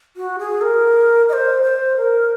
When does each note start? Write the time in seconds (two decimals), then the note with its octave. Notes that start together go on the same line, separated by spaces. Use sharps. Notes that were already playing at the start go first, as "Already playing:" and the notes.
0.17 F#4
0.39 G#4
0.61 A#4
1.29 D#5
1.33 C5
1.63 C5
1.97 A#4